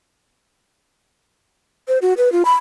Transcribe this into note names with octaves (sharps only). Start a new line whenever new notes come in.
C5
F#4
B4
F4
B5